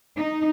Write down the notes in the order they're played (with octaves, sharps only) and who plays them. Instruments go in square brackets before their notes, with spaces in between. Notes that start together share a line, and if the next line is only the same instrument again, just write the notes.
[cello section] D#4